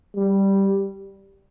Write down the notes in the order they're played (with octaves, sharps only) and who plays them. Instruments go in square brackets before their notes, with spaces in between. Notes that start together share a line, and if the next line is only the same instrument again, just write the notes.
[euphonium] G3